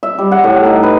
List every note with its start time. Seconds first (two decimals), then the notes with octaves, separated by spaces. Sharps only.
0.03 E5
0.18 G3
0.32 F#5
0.44 A2
0.65 D#4
0.83 B4